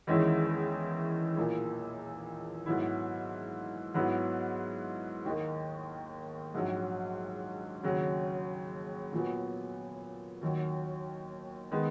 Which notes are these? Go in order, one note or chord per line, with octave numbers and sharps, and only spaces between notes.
E2 D#3 G#3 C#4 E4
B1 A#2 A#3 E4
G#2 F#3 B3 E4
G#2 F#3 B3 E4
D#2 D#3 A#3 D#4
A#1 G#2 F#3
D#2 C#3 F#3
A#2 F#3 B3
D#2 D#3 F#3
D#3 G#3 B3